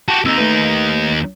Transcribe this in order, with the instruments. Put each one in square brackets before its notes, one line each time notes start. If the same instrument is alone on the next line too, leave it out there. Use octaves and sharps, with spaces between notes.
[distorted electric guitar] F#4 G4 [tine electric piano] A5
[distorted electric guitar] D#2 D#4 [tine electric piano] C4 E6
[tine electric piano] A3 B4